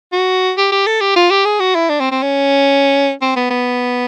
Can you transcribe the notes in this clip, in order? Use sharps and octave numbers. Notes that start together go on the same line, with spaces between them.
F#4
G4
G4
A4
G4
F4
G4
G#4
F#4
E4
D4
C4
C4
C#4
C4
B3
B3